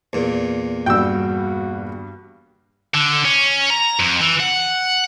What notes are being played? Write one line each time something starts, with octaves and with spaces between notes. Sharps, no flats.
E2 A#2
G2 G3 F#4 G5 E6
D3
C#4
A#5
F2
E3
F#5